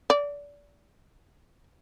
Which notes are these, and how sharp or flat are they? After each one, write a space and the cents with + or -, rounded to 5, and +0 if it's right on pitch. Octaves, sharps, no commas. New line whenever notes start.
D5 -25